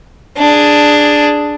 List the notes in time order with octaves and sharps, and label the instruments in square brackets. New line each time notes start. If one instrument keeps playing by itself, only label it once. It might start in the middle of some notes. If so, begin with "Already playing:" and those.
[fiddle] D4 G#4